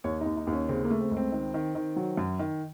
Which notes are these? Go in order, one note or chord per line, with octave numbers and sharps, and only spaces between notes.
D#2 C#5
D#2 D#4
D#4
D#2
C#4
C#3 C4
A#3
A3
C4
C#2
C4
D#3
D#3
D#3
F#3
F#2
D#3